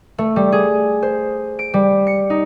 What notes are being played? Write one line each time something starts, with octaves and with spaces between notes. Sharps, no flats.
A3
G3
G#4
C5
D7
G3
C#7
D#4